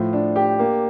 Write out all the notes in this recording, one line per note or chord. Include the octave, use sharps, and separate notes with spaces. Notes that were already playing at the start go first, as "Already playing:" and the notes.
Already playing: A2 F3
D4
G4
A#3